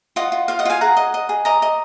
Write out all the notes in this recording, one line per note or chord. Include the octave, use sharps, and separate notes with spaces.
F4 D#5 F#5
F4
F4 F5
D#5 F#5
F4 F5 G#5
G#4 F#5 A#5
D#5
D#5
G#4
D#5 A#5 D6
D#5